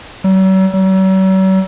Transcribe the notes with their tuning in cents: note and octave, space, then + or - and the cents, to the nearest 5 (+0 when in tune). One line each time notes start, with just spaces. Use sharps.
F#3 +45
F#3 +45